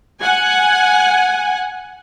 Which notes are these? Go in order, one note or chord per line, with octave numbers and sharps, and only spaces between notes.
F#5 G#5